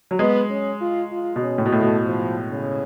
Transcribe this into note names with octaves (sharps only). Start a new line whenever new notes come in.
F#3
G#3 B3
C#4
F4
F4
B2
C#4
A2
B2
A2 A3
B2
F3
C#3